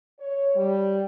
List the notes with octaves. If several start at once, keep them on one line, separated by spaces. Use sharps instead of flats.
C#5
G3